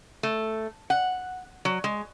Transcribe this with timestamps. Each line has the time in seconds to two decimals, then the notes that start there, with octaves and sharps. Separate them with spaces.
0.23 A3
0.90 F#5
1.65 F#3
1.84 G#3